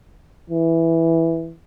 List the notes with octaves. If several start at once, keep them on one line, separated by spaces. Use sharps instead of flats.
E3